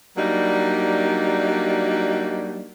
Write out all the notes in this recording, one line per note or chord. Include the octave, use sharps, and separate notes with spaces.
F#3 G3 A#3 D4 D#4